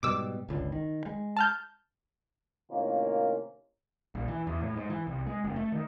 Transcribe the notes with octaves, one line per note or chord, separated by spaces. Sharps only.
G#2 B2 G3 D6 E6
G1 C#2 D3
D#3
G#3
A5 F6 G6
A2 C3 D#3 A#3 C#4 F4
A#1
E3
E2
A2
G#2
E3
C2
G#3
F#1
A3
D#3